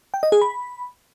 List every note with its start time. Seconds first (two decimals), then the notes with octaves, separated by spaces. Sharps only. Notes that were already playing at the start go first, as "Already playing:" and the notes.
0.14 G5
0.23 D#5
0.32 G#4
0.41 B5